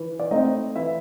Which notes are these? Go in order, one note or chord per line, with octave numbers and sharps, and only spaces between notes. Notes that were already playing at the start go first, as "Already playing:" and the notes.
Already playing: E3
D5
A3 C4 D#4 D#5
E3 E4 E5